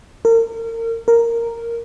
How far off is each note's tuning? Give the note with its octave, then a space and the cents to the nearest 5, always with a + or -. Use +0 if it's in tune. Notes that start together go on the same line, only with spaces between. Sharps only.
A#4 -35
A#4 -5